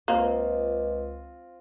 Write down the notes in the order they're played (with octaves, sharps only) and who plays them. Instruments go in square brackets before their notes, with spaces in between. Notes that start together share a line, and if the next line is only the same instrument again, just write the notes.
[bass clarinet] C#2 [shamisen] A#3 [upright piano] C4 F4